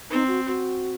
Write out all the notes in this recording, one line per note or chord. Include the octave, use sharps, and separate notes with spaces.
C4 D#4
F#4
F#4